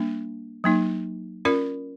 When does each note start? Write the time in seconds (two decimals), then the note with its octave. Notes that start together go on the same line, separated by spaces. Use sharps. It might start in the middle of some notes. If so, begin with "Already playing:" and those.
Already playing: G3 A#3 D4
0.64 F#3 A#3 D#4
1.45 C#4 F4 A#4 D5